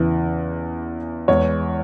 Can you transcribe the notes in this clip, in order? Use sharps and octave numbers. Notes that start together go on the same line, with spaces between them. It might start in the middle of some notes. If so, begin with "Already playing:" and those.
Already playing: E2 C#3 E3
E2 E3 G#3 C#5